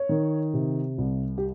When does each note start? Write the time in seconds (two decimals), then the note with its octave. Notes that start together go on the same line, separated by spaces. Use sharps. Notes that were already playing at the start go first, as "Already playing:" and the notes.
Already playing: C#5
0.09 D#3
0.54 C3
0.98 C2
1.38 G4